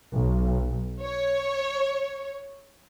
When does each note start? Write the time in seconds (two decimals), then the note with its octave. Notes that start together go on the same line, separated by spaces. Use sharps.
0.13 B1
1.02 C#5